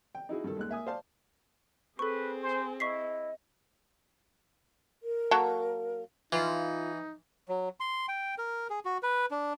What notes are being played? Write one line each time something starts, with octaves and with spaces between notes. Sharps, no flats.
G5
D#4 E4 F#4 G#4
G2 D#3 A4
D#2 G#3 F#6
A#3 E5 G#5 D#6
C5 D5 F5 A5
C4 G#4 A4 B4 C#6
C5 G#5
E4 D#5 C#6 B6 C7
A#4
F#3 A#3 A4
E3 D#4 F4
F#3
C6
G5
A#4
G#4
F#4
B4
D4